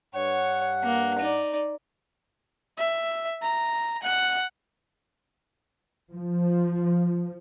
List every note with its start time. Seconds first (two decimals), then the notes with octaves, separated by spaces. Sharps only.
0.15 G2 C#5 F#5
0.84 A#3
1.19 D#4 D5
2.77 E5
3.42 A#5
4.03 F#5
6.11 F3